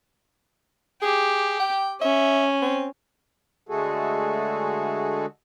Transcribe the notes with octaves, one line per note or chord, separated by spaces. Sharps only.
G4 G#4
G5
C#4 E5
C4
D3 G#3 A3 F#4 G#4 A4